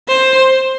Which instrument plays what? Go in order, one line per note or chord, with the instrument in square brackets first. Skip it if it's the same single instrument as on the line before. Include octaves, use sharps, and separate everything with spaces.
[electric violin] C5